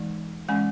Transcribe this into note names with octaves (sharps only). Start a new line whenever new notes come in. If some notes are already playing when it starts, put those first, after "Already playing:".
Already playing: E3 G#3 D#4
E3 G#3 C#4 G#5